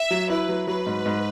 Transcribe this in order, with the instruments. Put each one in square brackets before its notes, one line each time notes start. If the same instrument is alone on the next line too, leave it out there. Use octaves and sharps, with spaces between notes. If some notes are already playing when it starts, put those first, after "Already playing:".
Already playing: [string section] E5
[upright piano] F#3
[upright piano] E4 [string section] B4
[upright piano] F#3
[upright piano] F#3 [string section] B4
[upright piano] G#2
G#2